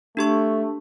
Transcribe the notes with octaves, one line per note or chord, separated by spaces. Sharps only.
A3 D4 G4 C#6